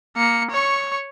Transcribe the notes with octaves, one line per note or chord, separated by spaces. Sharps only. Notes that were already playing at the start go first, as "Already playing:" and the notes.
A#3 C#7
C#5 C#6